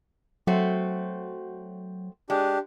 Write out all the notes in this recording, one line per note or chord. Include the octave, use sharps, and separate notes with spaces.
F#3 A3 C4 F#4
G#3 D4 G4